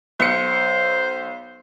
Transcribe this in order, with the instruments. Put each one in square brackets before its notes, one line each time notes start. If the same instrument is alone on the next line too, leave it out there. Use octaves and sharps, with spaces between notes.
[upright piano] B1 C#7 [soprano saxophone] C5